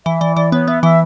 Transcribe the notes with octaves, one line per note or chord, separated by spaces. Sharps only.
E3 E5
E3 D5
E3 D5
B3 C#5
B3 E5
E3 E5